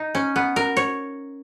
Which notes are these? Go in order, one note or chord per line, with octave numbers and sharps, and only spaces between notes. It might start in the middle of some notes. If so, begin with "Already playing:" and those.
Already playing: D#4
C#4
B3
A#4
C#5